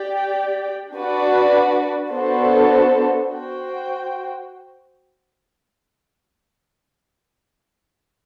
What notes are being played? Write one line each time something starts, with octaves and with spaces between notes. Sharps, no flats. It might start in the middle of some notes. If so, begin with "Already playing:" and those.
Already playing: G4 D5 G5
D4 F#4 B4 D5
B3 D4 F#4 A4 C5
F#4 C5 G5